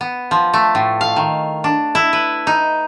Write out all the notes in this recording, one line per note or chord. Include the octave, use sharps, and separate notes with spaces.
B3
F3
A3
A2
F5
D#3
D4
E4
B4
D#4